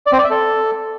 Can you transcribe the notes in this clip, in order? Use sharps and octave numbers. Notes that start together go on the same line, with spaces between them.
D5
C4
D5
E5
A4